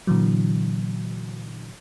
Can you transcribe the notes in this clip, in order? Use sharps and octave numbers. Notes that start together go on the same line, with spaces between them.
A#2 D3 E3 F#3